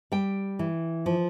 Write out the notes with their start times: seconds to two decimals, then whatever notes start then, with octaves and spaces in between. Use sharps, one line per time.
0.12 G3 G5
0.59 E3
1.06 F3